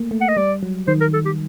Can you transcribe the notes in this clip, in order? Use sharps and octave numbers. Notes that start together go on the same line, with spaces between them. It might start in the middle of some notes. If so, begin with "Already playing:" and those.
Already playing: A3 A#3
A3
F#5
D#5
G3 D5
F#3
D#3 C5
A#4
A4
G4